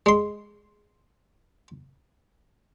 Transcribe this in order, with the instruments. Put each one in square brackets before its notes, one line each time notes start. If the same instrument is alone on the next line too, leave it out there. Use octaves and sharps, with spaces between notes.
[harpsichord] G#3 C6